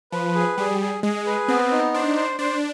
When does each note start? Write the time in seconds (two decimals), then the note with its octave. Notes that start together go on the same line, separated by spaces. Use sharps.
0.12 F3 B4
0.35 G#4
0.58 G3 G#4
0.80 G#4
1.03 G#3 G#4
1.26 B4
1.48 B3 C4
1.71 D#4
1.94 D4 C5
2.16 C5
2.39 D4 C5